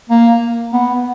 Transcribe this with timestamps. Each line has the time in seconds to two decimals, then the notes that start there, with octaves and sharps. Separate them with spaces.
0.09 A#3
0.73 B3